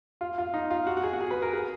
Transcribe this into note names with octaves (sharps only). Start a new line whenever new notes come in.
F4
F4
D#4
F4
F#4
F#4
G#4
F#4
G#4
B4
A#4
G#4